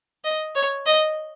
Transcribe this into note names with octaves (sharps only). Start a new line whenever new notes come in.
D#5
C#5
D#5